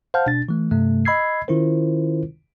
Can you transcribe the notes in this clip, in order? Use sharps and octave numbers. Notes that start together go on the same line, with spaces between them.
C5 F5 F#5 A5 F6 G6
B2 D4 A6
E3 A3
G2 C3 A3
D#5 B5 E6 G#6 C7
D#3 C#4 E4 F4 A#4 C5